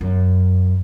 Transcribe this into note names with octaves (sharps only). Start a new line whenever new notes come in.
F#2